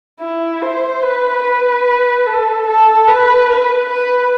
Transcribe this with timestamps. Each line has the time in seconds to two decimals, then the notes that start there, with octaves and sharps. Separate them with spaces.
0.20 E4
0.62 C5
1.03 B4
1.44 B4
2.26 A4
2.66 A4
3.08 B4
3.49 B4
3.89 B4